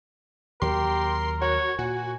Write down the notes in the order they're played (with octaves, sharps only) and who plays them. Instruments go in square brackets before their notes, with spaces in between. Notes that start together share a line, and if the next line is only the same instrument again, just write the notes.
[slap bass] D#2 F#3 [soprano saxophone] G4 [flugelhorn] A#4 [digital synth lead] C6
[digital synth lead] F#4 [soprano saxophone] C#5
[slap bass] A#2 [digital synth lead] F#4 [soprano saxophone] G#5